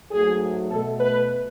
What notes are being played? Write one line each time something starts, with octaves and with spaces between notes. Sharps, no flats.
G#2 F#3 A3 G#4
B2 A3 A4
B4